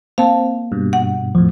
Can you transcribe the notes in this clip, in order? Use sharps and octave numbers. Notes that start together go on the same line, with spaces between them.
A#3 C4 F5 A5
G2 B2
F#5
E2 A2 F3